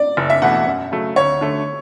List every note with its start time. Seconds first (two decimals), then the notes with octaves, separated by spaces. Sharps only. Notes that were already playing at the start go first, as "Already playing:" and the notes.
Already playing: D5
0.17 F#1
0.30 E5
0.42 E2 B2 A3 F#5
0.67 F#2
0.92 C#3 F#3 A3
1.16 D2 C#5
1.41 D3 A3